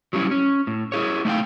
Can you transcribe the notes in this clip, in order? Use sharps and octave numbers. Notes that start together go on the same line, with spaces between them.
F#3 G3 C#4 D#4 E4
C#4
A2
E4 G#4 C#5
A3 D#4 C#5 F5 G5